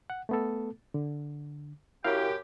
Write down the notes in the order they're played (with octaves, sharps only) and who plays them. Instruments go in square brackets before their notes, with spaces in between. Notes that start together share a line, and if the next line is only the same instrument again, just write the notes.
[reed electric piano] F#5
A3 B3 A4
D3
[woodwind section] F#2 G4 G5 [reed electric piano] E4 A#4 F5